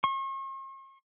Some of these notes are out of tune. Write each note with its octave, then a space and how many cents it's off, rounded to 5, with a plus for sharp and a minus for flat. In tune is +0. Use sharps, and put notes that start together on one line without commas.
C#6 -45